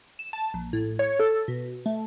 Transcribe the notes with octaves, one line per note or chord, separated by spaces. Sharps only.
E7
A5
A#1
A2
C#5
A4
B2
A3